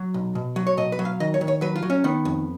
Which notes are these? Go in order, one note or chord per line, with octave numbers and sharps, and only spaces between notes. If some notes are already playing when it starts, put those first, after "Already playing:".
Already playing: F#3
B1
B2
F#3
C#5
B2 D#5
B4
F#3
F5
D#3 D#5
C#5
D#3
C#5
F#3 B4
F4
F#3
C#4
D#3 B3
F2